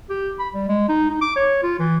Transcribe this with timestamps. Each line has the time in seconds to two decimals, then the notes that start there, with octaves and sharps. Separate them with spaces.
0.10 G4
0.39 B5
0.54 G3
0.68 G#3
0.89 D#4
1.10 D#4
1.22 D6
1.36 C#5
1.63 F4
1.79 E3